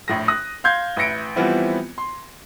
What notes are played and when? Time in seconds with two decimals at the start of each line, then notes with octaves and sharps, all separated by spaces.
0.08 A#1 A2 A#6
0.28 D#6 F#6 A#6
0.64 F5 C6 G6 G#6
0.97 A1 B4 E5 A#6 C#7 D7
1.36 E3 F3 G3 B3 C4 E4
1.98 C6